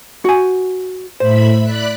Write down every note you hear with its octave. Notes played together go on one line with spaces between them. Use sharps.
F#4 G#5
A2 C5 E5 B5
D5 B5 F#6